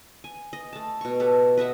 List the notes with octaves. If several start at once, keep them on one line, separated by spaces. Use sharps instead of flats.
G#5
D#5
A3 A5
B2 C#6
G4 A4 B4 C#5
B4 D#5 E5 F#5